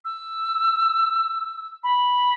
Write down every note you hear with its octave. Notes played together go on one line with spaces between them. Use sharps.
E6
B5